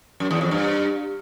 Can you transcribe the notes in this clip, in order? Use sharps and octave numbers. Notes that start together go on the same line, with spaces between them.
F#2
E2
F2
G2